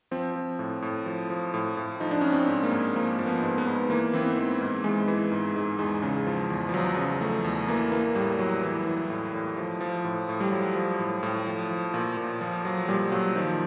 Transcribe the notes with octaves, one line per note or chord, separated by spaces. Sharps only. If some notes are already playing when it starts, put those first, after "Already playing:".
F3 C4
F3
A2
A2
F3
F3
A2
A2
F3 D#4
D4
F3 C#4
C4
G#2
A#3
G#2
F3 A#3
F3
B3
G#2
B3
G#2
E3 A#3
E3 C4
B3
G#2
G#2
E3 G#3
E3
G#2
G#2
E2 G#3
C#3
F3
E2
F3
E2 F#3
C#3
F3 A3
E2
E3 A#3
E3 A#3
A2 G3
A2 F#3
E3
E3
A2
A2
F3
F3
A2
A2
G3
F3 F#3
F3
A2
A2
F3
F3
A#2
A#2
F3
F3 F#3
A#2 G3
A#2 F#3
D#3 F3